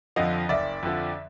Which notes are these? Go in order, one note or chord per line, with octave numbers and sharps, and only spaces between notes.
F2 D3 F3 D#5 F5
F#1 D5 E5
F2 D3 F3